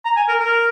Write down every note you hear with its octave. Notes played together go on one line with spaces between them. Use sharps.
A#5
G#5
A#4
A#4